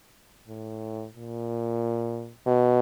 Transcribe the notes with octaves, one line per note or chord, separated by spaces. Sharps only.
A2
A#2
B2